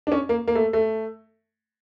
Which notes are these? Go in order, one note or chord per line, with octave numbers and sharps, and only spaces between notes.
D4
C#4
A#3
A#3
A3
A3